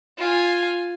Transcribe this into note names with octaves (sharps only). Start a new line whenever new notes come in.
F4 G#5